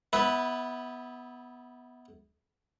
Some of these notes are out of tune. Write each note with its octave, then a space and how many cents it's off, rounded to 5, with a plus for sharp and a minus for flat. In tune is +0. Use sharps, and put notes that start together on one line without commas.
B3 +0 E4 -30 B4 +0